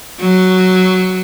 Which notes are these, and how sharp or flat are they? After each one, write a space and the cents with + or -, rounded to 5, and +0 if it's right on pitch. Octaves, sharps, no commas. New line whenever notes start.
F#3 +5